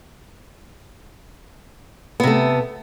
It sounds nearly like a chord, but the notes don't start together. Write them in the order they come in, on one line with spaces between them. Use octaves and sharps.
B3 C3 A3